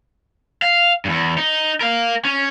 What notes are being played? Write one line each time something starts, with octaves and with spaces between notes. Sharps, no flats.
F5
E2 G2
D#4
A#4 F5
C#4